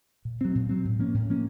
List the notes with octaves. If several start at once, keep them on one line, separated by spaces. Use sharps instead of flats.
A#2
F#3 C4
A#2
F#3 C4
A2
F3 A#3 C#4
A2
F3 A#3 C#4